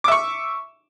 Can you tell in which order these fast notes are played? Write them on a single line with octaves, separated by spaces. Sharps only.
D6 E5 C#6